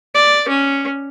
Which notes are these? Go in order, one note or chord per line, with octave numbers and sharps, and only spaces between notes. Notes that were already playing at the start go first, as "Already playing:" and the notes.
D5
C#4